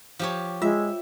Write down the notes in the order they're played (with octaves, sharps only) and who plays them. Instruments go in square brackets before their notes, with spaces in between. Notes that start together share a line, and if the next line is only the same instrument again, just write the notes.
[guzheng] F3 G4 C#5
[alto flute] G#3 [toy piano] F4 [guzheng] E5